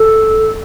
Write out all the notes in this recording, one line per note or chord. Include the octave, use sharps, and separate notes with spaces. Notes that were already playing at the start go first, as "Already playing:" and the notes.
Already playing: A4